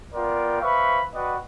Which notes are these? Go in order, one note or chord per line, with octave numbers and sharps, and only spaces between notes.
B3 F4 A#4 D5 G5 C6
B4 C5 E5 F5 B5 C#6
F#4 B4 D5 D#5 F#5 G5